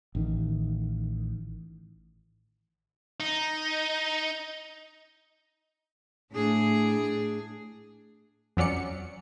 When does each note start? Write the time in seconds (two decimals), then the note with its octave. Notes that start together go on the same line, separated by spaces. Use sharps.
0.15 A1 D#3
3.20 D#4
6.33 A2 D4 G#4
8.57 F2 F#3 C#4 D5 C#7